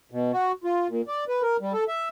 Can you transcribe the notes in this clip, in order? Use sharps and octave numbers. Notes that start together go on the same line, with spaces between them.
B2
F#4
F4
A#2
D5
B4
A#4
G3
A4
E5